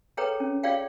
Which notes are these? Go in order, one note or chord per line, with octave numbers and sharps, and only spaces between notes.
G#4 A4 B4 C#5 G5 A#5
C#4
F4 G#4 C#5 D5 F5 G5